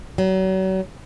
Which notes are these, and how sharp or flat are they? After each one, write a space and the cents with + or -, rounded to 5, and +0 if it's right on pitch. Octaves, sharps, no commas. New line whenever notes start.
F#3 +35